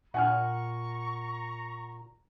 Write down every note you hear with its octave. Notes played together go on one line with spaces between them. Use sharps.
A#2 F#5 G#5 A#5 C#6 F6